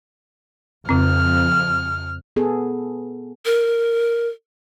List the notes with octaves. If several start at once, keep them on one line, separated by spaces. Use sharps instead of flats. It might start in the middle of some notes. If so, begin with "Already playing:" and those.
F2 C#3 C4 F6
B3 G#4 A4
A#4